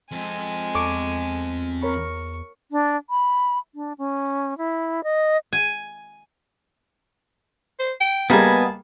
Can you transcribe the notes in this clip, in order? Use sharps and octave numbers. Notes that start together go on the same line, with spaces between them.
F2 G#3 C4 G#5
E2 A4 C#6 D6
A#4 C#5 B5 C#6
D4
B5
D4
C#4
E4
D#5
G#5
C5
G5
G3 A#3 B3 G#4 D#5 G#5 A5